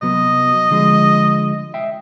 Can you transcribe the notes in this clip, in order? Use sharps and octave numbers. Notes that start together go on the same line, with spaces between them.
C2 F#3 B3 D#5
D3 F3 G#3
D#5 E5 G5